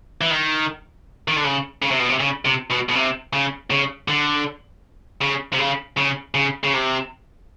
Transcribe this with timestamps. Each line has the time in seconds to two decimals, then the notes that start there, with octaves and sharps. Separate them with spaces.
0.21 E3
0.31 D#3
1.28 D#3
1.36 D3
1.44 C#3
1.82 C#3
1.91 C3
1.99 B2
2.09 C3
2.20 C#3
2.45 C3
2.70 B2
2.89 B2
2.95 C3
3.33 C#3
3.70 C#3
4.08 D3
5.22 C#3
5.53 C3
5.59 C#3
5.97 C#3
6.35 C#3
6.63 C#3
6.73 C3